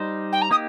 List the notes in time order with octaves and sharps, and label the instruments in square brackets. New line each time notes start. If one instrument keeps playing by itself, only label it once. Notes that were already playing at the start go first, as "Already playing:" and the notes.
Already playing: [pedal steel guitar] G3 D#4 C5
[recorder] G5
A#5
[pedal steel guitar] A#3 D#4 G4 [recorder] D#6